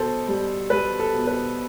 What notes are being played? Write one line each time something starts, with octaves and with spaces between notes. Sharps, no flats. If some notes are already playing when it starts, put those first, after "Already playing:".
Already playing: B2 A4 C5
G3
G3 B4
A4
B2
B4